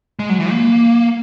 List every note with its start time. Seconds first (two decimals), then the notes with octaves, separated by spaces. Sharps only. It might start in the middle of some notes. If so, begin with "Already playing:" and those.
0.19 G#3
0.29 F#3
0.40 E3
0.50 A#3